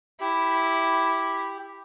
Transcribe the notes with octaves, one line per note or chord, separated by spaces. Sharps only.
E4 G4